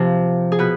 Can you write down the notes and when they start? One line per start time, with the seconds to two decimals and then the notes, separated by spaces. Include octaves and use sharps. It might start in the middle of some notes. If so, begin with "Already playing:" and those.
Already playing: C3 F3
0.52 G#4
0.59 B2 B4